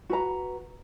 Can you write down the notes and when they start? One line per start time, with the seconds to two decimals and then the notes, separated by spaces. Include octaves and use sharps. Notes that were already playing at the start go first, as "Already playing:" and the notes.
0.10 F#4 B4 A#5